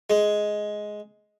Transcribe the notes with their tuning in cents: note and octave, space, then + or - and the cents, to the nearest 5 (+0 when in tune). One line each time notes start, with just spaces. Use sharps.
G#3 +10